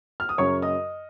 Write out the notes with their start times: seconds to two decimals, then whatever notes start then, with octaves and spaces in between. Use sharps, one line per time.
0.20 F6
0.29 D#6
0.38 F#2 C#3 F#3 C#5 C#6
0.62 D#5 D#6